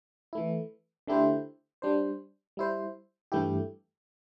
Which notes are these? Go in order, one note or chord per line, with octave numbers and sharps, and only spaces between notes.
E3 A3 E4
D3 A3 E4 G4 C5
G3 D4 C5
G3 E4 C5
G2 E3 A3 E4 G4